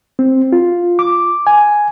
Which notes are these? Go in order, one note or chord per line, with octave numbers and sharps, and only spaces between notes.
C4
F4
D6
G#5